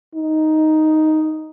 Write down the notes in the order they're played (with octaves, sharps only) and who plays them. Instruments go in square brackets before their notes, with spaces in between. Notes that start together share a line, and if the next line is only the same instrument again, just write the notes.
[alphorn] D#4